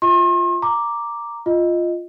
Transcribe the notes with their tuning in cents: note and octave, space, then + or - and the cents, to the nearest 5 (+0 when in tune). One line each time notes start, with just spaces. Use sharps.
F4 +0 E5 -30 C6 +40
A#5 +0 D6 +0
F4 +0 D#5 +0